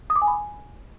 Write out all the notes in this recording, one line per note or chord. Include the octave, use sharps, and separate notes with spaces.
D#6
D6
G#5
B5